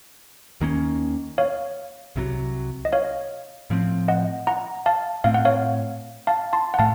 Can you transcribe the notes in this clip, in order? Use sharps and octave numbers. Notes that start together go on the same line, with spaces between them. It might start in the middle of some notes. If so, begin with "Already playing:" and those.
D#2 D#3 A#3 C#4
C#5 F5
C2 C3 D#3 F#3
D#5
C#5 F5
A2 F3 C4
D#5 F#5
F#5 A#5
F5 A5
A2 A3 C4 F5
F#5
C#5 F5
F5 A5
A5 C6
F#5
A2 A3 F5 A5